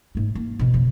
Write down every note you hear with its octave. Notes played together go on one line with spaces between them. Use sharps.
G#2 A3
A#3
F2 B2
F2 C#3